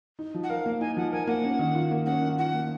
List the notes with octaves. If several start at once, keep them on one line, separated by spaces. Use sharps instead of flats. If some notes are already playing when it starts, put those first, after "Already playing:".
D#4
F3
F#5
A#4 F5
A#3
D#4 G#5
F3 F#5
A#4 G#5
A#3 F#5
C#4
D#3
F4
A#3
C#4 F#5
D#3
F4 F#5
A#3